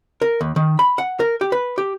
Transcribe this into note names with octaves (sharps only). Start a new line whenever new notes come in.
A#4
D#2
D#3
B5
F#5
A#4
G4
B4
G4